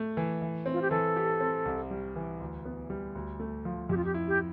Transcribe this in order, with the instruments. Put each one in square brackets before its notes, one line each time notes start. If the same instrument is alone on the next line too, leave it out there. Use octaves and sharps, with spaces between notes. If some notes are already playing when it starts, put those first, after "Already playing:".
Already playing: [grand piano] A3
E3
E3
C4
[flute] F4
G4
[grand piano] E3 [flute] A4
[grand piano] G4
C4
C2
G3
E3
D2
B3
G3
D2
A3
F3
[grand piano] F2 [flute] G4
[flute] F4
G4
[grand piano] E4
[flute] G4